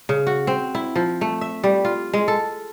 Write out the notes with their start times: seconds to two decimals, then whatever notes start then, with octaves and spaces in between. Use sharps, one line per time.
0.09 C#3
0.27 F#4
0.47 C4
0.75 E4
0.96 F3
1.21 A3
1.41 E5
1.64 G3
1.85 F4
2.13 G#3
2.28 A4